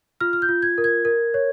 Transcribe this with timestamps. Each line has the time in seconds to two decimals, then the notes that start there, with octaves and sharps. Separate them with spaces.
0.21 F4 F6
0.33 F6
0.42 G6
0.49 F4
0.62 G#6
0.78 A#4
0.84 G#6
1.05 A#4
1.34 C#5